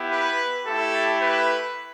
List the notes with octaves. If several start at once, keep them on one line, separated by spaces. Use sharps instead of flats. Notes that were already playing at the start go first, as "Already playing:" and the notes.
Already playing: B3 E4 G4
B4
A3 E4 G4 A4
B4